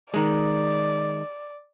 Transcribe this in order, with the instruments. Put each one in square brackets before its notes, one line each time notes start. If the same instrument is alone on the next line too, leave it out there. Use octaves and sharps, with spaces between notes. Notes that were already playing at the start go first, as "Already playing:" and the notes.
[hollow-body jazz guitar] D#3 G#3 [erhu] D5